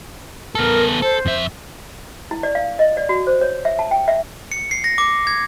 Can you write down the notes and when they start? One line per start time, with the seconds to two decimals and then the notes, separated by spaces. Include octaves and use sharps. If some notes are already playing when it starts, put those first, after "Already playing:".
0.55 B3 A4 A#4
1.02 A4 C5
1.26 F2 E5
2.31 E4
2.43 D5
2.55 F5
2.79 D#5
2.97 D5
3.09 F#4
3.27 C5
3.41 C#5
3.65 E5
3.79 A5
3.91 G5
4.08 E5
4.52 C#7
4.71 C7
4.84 A#6
4.98 D6
5.27 G#6